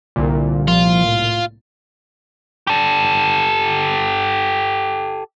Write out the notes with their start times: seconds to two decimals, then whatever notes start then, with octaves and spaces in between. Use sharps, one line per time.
0.16 C2 A#2 D3
0.68 F3 F4
1.04 A2
2.67 G4 A4